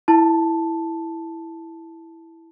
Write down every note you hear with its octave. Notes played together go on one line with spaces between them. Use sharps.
E4 A5